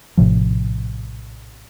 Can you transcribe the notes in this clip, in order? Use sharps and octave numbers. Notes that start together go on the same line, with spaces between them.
A#1 A2 C3 F3